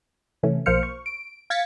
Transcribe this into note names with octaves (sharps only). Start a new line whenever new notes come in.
C3 E3 A3 C#4
B1 F3 A#3 C5 F6 C#7
C#6
D7
F5 G#6 A6 B6 C#7